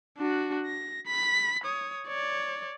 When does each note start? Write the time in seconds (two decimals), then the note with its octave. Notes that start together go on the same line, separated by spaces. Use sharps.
0.17 D4 F#4
0.66 A#6
1.07 B5 B6
1.64 C#5 D#6
2.08 C#5 D5